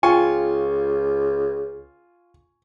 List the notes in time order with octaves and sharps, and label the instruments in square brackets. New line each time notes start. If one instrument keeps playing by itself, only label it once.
[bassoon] C#2 [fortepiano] F4 [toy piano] G5 [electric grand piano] G#5 C#6